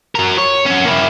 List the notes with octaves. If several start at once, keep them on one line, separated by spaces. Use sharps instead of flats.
F#3 A#4
C#5
C#4 F#4
A#3 E4